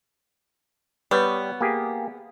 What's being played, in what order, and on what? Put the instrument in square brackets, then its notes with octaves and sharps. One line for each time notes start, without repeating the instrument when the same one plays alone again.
[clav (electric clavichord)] G3 C#5 [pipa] B3
[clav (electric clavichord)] A#3 G4 G#4